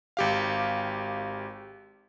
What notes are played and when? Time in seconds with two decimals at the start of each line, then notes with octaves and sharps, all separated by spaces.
0.17 G#1 G4 F5